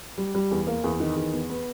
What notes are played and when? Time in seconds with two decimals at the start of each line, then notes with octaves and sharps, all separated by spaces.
0.18 G3
0.35 G3
0.51 E2
0.67 A#3
0.84 E2
1.00 D#3
1.16 E2
1.33 B3
1.50 B3